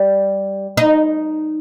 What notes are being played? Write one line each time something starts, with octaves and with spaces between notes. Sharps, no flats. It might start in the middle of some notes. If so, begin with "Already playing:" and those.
Already playing: G3
D#4